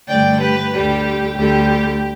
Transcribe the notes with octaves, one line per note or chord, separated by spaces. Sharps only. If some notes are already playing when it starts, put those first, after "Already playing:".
G2 D3 A3 D5 G5
G4 B4
D2 D3 G3 G4
D2 D3 G3 G4